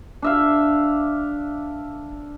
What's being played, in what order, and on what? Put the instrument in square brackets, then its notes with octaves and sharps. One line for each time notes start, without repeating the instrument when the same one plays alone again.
[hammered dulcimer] D4 E5 F5